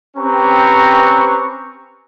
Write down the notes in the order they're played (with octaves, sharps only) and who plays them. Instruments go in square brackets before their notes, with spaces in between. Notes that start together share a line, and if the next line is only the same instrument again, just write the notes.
[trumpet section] C4 C#4 G4 B4 A#5 C#6